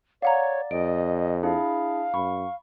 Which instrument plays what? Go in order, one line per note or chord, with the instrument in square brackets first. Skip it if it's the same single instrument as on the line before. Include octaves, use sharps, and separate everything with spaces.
[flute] C#5 [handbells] D5 [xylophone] F5 F#5 A#5
[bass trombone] F2 [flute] D#5 [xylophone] D7
[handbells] D4 E4 G#4 [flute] F5
[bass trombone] F#2 [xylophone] B5 [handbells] C#6